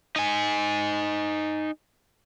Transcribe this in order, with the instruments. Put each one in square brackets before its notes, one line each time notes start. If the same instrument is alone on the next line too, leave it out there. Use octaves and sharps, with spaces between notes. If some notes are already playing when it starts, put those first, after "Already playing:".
[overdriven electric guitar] D#4 G#5